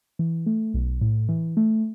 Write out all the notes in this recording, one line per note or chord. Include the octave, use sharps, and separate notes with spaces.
E3
A3
B1
A2
E3
A3